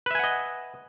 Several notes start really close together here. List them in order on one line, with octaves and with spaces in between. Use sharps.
B4 E5 G#5 F#5 D#5